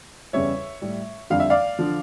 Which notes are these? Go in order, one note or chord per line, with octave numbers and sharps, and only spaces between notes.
E2 C#3 G3 C#5 E5
A2 G3
F2 D3 G3 F5
E5
D5 F5
D3 F3